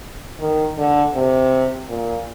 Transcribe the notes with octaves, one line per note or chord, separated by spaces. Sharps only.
D#3
D3
C3
A#2